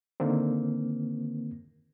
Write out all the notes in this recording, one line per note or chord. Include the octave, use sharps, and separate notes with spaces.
D3 D#3 A#3 C4